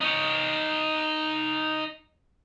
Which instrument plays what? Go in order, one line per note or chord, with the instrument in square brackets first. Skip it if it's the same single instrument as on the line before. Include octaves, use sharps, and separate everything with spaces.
[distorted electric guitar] D#4 C#5